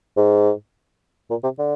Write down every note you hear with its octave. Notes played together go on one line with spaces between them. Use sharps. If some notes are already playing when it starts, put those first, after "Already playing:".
G#2
A#2
C3
D3